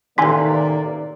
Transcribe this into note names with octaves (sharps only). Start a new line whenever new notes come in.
A1 C3 D#3 A#3 D5 G#5 C6 B6